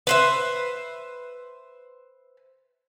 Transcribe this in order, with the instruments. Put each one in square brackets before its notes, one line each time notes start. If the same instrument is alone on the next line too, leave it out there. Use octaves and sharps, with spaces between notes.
[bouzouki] B4 C5 E5